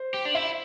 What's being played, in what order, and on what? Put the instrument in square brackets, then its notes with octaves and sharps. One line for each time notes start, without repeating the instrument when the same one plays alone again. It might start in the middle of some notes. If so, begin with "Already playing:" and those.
Already playing: [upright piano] C5
[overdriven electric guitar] G4
D4
[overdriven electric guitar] E4 [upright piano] E5